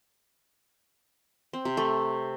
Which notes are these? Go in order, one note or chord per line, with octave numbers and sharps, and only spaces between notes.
C4
C3
A3